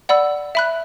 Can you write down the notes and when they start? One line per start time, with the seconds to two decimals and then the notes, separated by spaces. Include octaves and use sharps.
0.09 D5 F#5 B5 E6
0.55 E5 B5 F#6